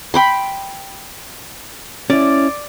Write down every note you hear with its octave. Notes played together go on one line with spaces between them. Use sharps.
G5 B5 C6
C#4 E4 D5